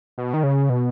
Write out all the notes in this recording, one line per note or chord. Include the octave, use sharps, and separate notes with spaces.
B2
D#3
C#3
B2